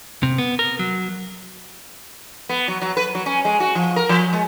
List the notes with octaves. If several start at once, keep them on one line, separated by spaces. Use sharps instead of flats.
C3
B3
A#4
F#3
B3
F#3
F#3
B4
F#3
C#4
G#3
F#4
F3
A#4
F3
G#3